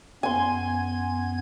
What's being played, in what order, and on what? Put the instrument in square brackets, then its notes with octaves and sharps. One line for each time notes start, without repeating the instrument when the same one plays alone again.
[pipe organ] F#2 B3 G#6 [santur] G#5 C6